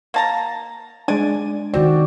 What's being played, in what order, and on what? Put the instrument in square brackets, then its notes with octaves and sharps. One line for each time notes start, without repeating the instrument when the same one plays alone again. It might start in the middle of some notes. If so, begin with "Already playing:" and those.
[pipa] A#3 A5 A#5
[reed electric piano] G#3 D4 [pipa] D5 G#5
[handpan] D#3 F#4 D5 [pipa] C4